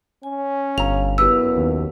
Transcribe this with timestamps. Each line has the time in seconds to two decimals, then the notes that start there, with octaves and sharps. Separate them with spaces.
0.23 C#4 G#5
0.78 G1 F5 A#5 F7
1.18 F#2 B3 E4 G4 B4 E6
1.57 D#2